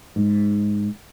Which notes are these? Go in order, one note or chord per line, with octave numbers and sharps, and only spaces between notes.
G#2